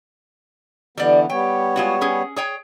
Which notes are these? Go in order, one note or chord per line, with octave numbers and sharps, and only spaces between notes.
D3 E3 G3 B3 D5
G3 B3 C#5 G5
G#3 F4 F#4
C#4 G#4
G#4 C#5 G5